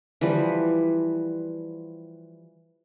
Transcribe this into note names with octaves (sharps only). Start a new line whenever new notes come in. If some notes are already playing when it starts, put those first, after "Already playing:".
E3 F3 G3 B4